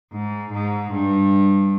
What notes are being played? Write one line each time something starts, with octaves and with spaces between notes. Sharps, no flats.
G#2
G#2
G2